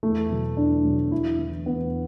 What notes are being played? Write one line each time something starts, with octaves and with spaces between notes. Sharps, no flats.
E2 A3
B2 F#3
E2 D4
B2 F#3
E2 E4
E3
E2 B3